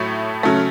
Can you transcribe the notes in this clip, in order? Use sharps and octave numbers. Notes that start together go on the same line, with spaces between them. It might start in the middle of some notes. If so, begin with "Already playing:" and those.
Already playing: A2 F#3 A3
C#3 F#3 A3